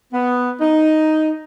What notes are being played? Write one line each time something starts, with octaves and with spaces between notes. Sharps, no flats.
B3
D#4